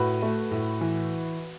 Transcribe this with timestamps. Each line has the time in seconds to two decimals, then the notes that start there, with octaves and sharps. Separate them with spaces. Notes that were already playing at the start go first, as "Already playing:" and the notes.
Already playing: A2 F#4 B4
0.22 A3
0.51 A2
0.81 E3